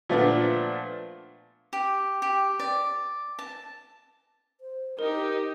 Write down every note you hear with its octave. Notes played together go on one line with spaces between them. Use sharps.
A#2 F3 A3 B3 D4
G4
G4
D5
A5
C5
D#4 G4 A#4 D#5